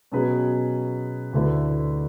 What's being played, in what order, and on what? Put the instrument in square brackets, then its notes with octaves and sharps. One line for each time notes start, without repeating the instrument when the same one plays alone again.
[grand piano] B2 F#3 C#4 G#4 B4
D2 D3 A3 E4 B4